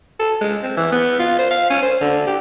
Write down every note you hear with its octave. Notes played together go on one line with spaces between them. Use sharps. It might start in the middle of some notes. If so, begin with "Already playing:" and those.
A4
G#3
C4
E3
B3
F4
C5
F5
C#4
C5
D3
G4